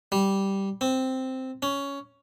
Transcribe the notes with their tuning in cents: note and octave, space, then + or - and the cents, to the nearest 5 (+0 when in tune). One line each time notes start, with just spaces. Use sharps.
G3 -5
C4 -5
C#4 +10